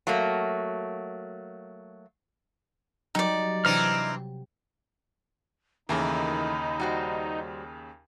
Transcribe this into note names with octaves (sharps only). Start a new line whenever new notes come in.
F#3 A3 A#3
F#3 G3 D#4 G4 D5
C3 E3 C4 D4 A#5 F6
D#2 C#3 E3 A3 D#4 A#4 B5
G3 F#4 C5